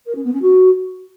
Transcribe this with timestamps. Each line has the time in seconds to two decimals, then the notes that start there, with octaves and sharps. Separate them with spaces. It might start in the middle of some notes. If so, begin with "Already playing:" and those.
0.06 A#4
0.15 C#4
0.24 B3
0.33 C#4
0.42 F#4